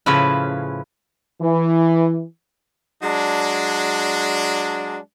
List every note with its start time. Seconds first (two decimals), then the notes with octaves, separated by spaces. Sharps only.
0.06 A2 C#3 F3 C#4 E4 B4
1.41 E3
3.02 F#3 G#3 D4